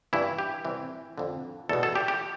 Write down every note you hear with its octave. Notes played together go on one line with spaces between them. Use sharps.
G2 E3 E4
G4
C2 C3 E3
F2 D3
E2 B2 A4
A4
G4
G4